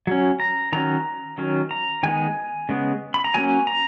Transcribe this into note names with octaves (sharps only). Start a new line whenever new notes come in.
F#3 C#4
A#5
D#3 F#3 C#4 A#5
D#3 F#3 C#4
A#5
D#3 G#3 B3 G#5
C#3 G#3 B3
B5
A#5
F#3 A#3 C#4 G#5
A#5